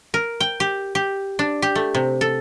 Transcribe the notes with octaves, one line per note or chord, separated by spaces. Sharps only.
A#4
G5
G4
G4
D4
G4
A3
C3
A4